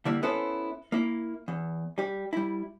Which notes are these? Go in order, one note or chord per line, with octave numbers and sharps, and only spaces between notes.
D3 G3 A#3 E4
B3 C#4 E4 A4 C5
A#3 E4
E2
G3 G4
G3 E4